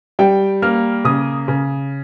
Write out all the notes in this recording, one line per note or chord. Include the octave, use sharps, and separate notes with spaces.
G3 G5
A#3 F6
C#3 D#6
C#3